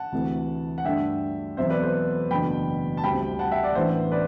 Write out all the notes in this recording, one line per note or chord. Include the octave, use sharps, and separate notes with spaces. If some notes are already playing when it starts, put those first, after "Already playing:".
Already playing: F#5 A5
D2 C3 E3 A3
F#5
G2 D3 A3 D4 E5 G5
E2 B2 F#3 C4 C5 E5
B4 D5
A4 C5
F#1 E2 B2 A3 D4 G5 B5
A5
D2 C3 G3 C4 G5 B5
F#5 A5
E5 G5
D5 F#5
A1 A2 E3 B3 D4 C5 E5
B4 D5